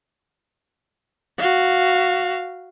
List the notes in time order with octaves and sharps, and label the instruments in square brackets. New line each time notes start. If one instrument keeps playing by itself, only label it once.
[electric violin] F#4 F5